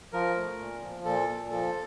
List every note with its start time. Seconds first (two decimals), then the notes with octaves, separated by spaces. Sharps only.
0.13 F3 A#4
0.37 A3
0.59 A#2
0.82 F3
1.05 A#2 A4
1.29 A#2
1.51 F3 A4